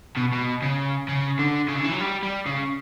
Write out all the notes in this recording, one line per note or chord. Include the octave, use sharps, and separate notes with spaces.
B2
B2
C#3
C#3
D3
C#3
D3
E3
F#3
G3
G3
C#3